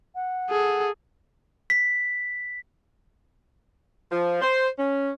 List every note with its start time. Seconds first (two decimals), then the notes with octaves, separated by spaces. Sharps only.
0.15 F#5
0.50 G#4 A4
1.70 B6
4.12 F3
4.42 C5
4.79 C#4